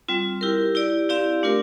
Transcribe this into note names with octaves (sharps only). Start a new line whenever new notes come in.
G3 C4 F4
E4 G4 A#4
E4 G4 D5
C4 E4 G4 D5 F5
A3 D4 F4 A#4